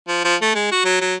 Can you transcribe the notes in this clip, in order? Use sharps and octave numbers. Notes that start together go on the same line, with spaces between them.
F3
F3
A3
G#3
F#4
F#3
F#3